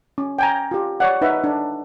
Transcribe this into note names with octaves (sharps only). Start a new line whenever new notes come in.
C#4
G5 G#5 A#5
F4 G4
C#5 D5 F#5
D#4 B4 E5 F#5
D4